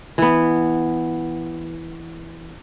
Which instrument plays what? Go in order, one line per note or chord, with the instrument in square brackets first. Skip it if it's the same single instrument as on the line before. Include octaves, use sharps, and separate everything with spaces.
[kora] E3 B3